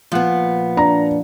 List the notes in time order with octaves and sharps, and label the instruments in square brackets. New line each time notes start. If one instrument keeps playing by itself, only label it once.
[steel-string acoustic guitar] A#2 B3 [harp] F3 F#5
[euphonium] D4 [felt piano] A#5